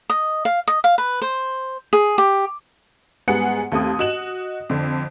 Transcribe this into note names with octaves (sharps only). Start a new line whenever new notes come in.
D#5
F5
D#5
F5
B4
C5
G#4
G4
G#2 G3 B3 G#4 F#5 C#7
D#2 A3 C4 D#6
F#4 D#5 E7 F#7
F2 D3